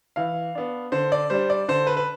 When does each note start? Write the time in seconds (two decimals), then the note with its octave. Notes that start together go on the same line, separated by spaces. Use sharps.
0.16 E3 F5
0.55 B3 D4
0.92 D3 C5
1.12 D5
1.30 G3 D4 C5
1.50 D5
1.68 D3 C5
1.87 B4
1.97 B4